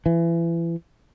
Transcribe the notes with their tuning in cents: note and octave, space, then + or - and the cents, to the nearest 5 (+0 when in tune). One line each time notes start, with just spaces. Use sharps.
E3 +30